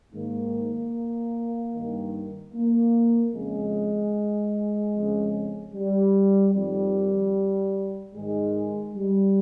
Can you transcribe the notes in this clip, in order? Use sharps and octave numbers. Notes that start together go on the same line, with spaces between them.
G#2 D#3 A#3
G2 D#3
A#3
F2 C#3 G#3
F2 C#3
G3
F2 D#3 G3
G#2 D#3 G#3
G3